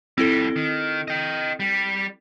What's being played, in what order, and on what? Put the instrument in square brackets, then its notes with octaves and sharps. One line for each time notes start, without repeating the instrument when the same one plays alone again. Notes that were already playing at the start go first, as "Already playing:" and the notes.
[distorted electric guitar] F2 G3 [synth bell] C4 E4 A4
[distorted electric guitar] D#3
D#5 G5
G3